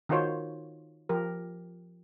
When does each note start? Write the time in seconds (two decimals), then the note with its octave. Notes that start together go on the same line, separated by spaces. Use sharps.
0.09 D#3 D#4 F4 F#4 C5 C#5
1.09 F3 G4 A#4